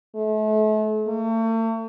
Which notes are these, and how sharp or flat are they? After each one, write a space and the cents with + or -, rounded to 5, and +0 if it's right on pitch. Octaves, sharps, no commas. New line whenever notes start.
A3 -40
A3 +40